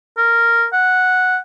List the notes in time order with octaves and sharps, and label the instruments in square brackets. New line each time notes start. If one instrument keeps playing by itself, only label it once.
[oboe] A#4
F#5